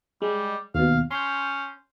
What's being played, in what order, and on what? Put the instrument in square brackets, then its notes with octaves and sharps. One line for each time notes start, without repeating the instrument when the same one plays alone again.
[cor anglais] G3 [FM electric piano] G#3
[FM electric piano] D#2 B2 [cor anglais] F5
[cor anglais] C#4 [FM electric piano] C6 G6